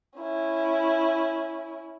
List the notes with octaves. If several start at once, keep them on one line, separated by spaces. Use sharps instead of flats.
C#4 E4